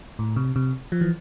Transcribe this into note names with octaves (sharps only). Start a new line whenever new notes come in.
A2
C3
C3
F3
E3